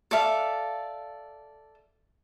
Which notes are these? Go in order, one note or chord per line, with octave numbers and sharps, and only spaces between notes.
A4 D5 E5 F5